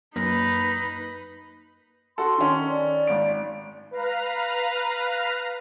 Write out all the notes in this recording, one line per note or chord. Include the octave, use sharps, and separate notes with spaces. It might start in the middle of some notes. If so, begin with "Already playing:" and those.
F#2 A#3 D#4 B4 A#5
F#4 A4 C6
D#3 C#4
D5
G#1 D7
B4 F5 A#5